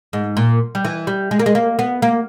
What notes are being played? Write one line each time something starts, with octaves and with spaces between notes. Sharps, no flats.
G#2
A#2
G3
E3
G3
G#3
A#3
G#3
A#3
B3
A#3